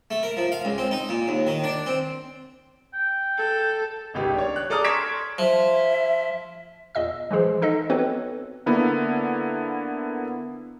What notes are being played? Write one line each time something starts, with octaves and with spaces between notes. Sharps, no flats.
A3
A#4
F3
F5
C#2
C4
D#4
A#2
D#2
D#3
D4
C4
G5
A4
G#1 C#2 G4
D4 C#5
F#6
G#4 A4 D5 A#5 D#6 F6
C6 C#6 G#6 B6 D7 E7
F3 E5
E2 A#2 D#5 E6
E3 F3 G#3 G#4 C5
D#4 A4 D#5
B3 C4 F#4 A4 B4 C#5
D3 A#3 B3 E4